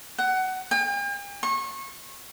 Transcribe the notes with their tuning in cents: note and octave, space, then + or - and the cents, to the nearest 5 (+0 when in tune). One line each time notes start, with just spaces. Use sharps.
F#5 +20
G5 +45
C#6 -30